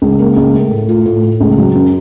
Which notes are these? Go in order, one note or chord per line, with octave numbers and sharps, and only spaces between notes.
C#2
A#3
C#2
A3
A2
F4
A2
A2
C#2
F#3
F#2